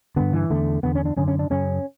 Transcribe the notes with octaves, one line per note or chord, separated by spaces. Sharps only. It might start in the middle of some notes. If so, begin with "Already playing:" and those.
G2 D3 B3
E3
E2 D3 A3
E2 D3 B3
C#4
D4
F#2 D3 C#4
C#4
D4
F#2 C#3 C#4